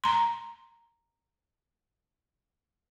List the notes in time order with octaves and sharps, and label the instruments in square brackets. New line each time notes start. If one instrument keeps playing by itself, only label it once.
[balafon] A#5 C6